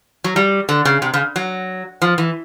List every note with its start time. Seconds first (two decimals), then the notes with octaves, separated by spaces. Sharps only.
0.24 F#3
0.36 G3
0.69 D3
0.85 C#3
1.02 C3
1.14 C#3
1.36 F#3
2.02 F3
2.18 E3